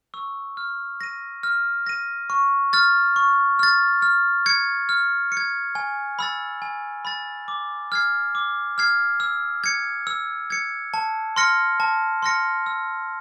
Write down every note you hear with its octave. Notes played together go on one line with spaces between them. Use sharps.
C#6 E6
F6
A#6 D#7
F6
A#6 D#7
C#6
F6 A6
C#6
F6 A6
F6
G#6 C#7
F6
C#7
G#6
G#5
B5 E6 A6
G#5
B5 E6 A6
D6
F6 G#6 C7
D6
F6 G#6 C7
E6
G#6 C#7
E6
G#6 C#7
A5
C6 F6 A#6 C#7
A5
C6 F6 A#6 C#7
E6